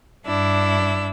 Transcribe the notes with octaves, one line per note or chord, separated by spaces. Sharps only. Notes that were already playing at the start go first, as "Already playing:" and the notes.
G2 D4 E4 E6